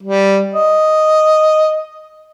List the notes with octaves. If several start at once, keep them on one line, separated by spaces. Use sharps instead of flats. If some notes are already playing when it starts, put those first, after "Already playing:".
G3
D#5